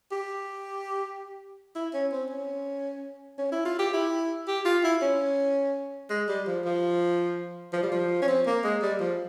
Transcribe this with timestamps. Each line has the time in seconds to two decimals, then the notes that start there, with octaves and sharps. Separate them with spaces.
0.12 G4
1.75 E4
1.94 C#4
2.12 C4
2.30 C#4
3.38 C#4
3.52 E4
3.65 F4
3.79 G4
3.93 E4
4.48 G4
4.65 F4
4.84 E4
5.02 C#4
6.10 G#3
6.28 G3
6.47 F3
6.65 F3
7.73 F3
7.83 G3
7.92 F3
8.22 C#4
8.28 C4
8.46 A#3
8.64 G#3
8.82 G3
9.00 F3